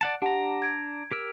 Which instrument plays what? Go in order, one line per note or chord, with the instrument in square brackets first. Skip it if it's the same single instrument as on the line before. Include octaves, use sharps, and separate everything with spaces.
[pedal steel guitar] D5 F#5 A5
[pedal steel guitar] D4 A#5 [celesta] G4 F#5 A5
[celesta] G#6 D7
[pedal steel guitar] G4 A#4 E6